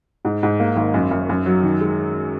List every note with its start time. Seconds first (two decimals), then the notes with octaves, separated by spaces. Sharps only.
0.25 G#2
0.43 G#2
0.60 A#3
0.76 G#1
0.94 F#2
1.11 F#2
1.29 F#2
1.46 F#3
1.63 D#3
1.81 G#3